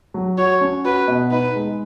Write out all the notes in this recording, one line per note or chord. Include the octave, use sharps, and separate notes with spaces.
F#3
F#4 C#5
C#4
F#4 B4
B2
D#4 B4
G#3